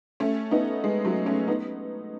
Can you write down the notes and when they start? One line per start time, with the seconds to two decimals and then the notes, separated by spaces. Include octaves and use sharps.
0.20 A3 C#4
0.51 B3 D#4
0.84 G#3
1.05 F#3 A3
1.26 A3 C#4
1.48 B3 D#4